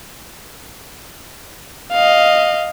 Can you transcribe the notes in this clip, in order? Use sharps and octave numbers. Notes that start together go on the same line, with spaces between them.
D#5 F5